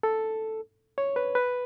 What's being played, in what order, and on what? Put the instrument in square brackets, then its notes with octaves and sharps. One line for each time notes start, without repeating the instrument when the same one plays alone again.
[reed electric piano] A4
C#5
B4
B4